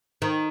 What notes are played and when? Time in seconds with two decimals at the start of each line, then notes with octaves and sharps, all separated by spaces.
0.22 D#3